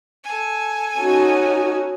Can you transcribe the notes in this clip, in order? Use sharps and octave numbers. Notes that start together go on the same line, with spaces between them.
A4 G#5
C#4 D#4 F#4